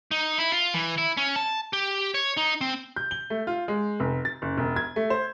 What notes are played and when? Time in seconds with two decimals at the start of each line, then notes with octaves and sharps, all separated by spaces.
0.11 D#4
0.38 E4
0.52 F4
0.74 E3
0.98 E4
1.17 C#4
1.36 A5
1.73 G4
2.14 C#5
2.37 D#4
2.61 C4
2.96 G6
3.11 G7
3.30 A3
3.47 F4
3.68 G#3
4.00 F1
4.25 A6
4.42 F#1
4.57 E1
4.76 G#6
4.96 A3
5.10 C5